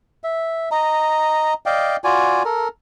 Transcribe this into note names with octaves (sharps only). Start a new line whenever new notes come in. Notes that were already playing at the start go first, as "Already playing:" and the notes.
E5
D#5 A#5
D5 D#5 F5 G5
F4 F#4 D5 G#5
A4 A#4